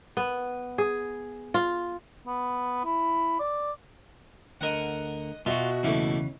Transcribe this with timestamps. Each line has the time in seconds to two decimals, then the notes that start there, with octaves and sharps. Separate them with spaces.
0.17 B3
0.78 G#4
1.54 F4
2.27 B3
2.85 E4
3.39 D5
4.61 D2 D3 A#4 D#5 F#5
5.46 B2 F4 F#4 E5
5.83 E2 C#3 E3 A3 A#3 E4